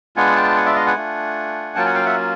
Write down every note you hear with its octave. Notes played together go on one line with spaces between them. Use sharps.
G#3 B3 D4 F4 F#5 G#5
G5 A5
F#5 G#5
D5 E5
D#5 F5
F#5 G#5
A3 D4 F4
F#3 A#3 C#4 F4 G5 A5
F#5 G#5
F5 G5
E5 F#5